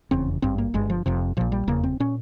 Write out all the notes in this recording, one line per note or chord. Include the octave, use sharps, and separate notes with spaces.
F1 E2 C#3 C4
G#1 G2 C4
A#3
G1 G2 G#3
F3
F1 F2 C3
A#1 A#2 F3
G3
F1 E2 C#3 A#3
C4
A#2 C#4